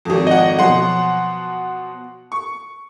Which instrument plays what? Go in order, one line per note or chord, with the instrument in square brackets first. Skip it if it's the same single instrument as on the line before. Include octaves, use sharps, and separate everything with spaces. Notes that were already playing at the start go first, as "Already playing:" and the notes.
[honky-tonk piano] G#1 F2
[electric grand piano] D#5 F#5
[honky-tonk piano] B2 F3 F#3 [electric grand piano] F#5 C6
[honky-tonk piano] C#6